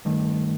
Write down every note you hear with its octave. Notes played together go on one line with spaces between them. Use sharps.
G2 D#3 A3